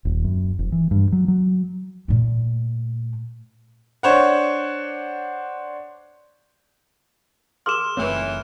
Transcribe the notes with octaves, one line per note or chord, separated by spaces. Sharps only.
D#1
F#2
F1
E3
G2
F#3
F#3
A#2 A3
D4 C5 C#5 F#5
G#4 A#4 C6 F6 E7
F#1 A#2 D#3 E3 A3 C4 B4 C#5